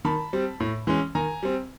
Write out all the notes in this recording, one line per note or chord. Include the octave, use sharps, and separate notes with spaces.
D#3 A5 B5
G3 C4
A2
E3 G#3 C#4
D#3 G#5 A#5
G3 C4